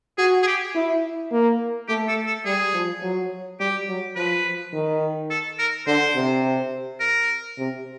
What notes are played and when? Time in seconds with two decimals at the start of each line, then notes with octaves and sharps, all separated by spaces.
0.18 F#4 G#4
0.43 G#4
0.47 G4
0.75 E4
1.32 A#3
1.88 A3 G4
2.08 A4
2.27 A4
2.45 G3 G#4
2.74 F3
3.02 F#3
3.60 G3 G4
3.88 F#3
4.16 F3 B4
4.73 D#3
5.31 A4
5.59 A#4
5.87 D3 C5
6.15 C3
7.00 A#4
7.58 C3